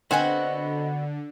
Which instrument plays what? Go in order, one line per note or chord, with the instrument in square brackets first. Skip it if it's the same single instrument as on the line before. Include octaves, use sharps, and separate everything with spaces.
[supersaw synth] D3 [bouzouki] B3 F#4 [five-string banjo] C4 C5 G#5 [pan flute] D#5